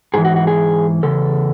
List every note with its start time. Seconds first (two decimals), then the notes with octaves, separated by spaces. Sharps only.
0.14 G#2 E3 G#4
0.25 F#4
0.36 F#4
0.47 G#4
1.03 E2 C#3 A4